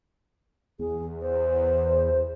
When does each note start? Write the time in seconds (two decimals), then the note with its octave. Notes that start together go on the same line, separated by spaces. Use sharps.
0.79 E2 G#4
1.22 C5